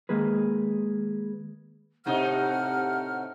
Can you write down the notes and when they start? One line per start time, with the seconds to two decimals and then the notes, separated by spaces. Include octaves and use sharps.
0.09 D#3 G#3 A#3 G#4 B4
2.06 A2 C3 D#4 F#5 F6